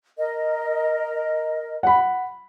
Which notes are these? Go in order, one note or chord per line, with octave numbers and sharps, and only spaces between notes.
A#4 D#5
F#5 B5